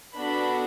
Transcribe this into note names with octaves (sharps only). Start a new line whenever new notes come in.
B3 D4 F#4 A4 B5